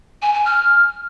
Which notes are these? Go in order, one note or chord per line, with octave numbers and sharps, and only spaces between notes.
G#5
G#5
F6